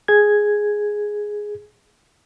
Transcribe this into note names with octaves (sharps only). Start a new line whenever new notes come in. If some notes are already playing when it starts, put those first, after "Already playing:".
G#4 G#6